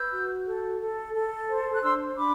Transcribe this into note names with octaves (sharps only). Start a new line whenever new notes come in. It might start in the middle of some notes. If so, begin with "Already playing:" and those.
Already playing: B4 E6 G6
F#4
A4
A4
A4
C5
F#6
D4 C6 E6
D4 B5 D6